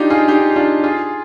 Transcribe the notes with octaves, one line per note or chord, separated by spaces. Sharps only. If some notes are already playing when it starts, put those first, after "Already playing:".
Already playing: D4 D#4 F4 G4
F4 G#4
D#4 G4
D4 F4
F4 G#4